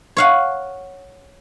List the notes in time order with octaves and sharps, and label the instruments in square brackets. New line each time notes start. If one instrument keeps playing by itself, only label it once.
[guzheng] C#5 F5 F#5